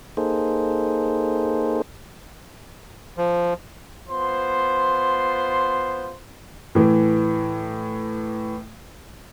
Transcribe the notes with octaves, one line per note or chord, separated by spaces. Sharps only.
A#3 D#4 G#4 A4 C5
F3
B3 F4 C5 C6
A2 E3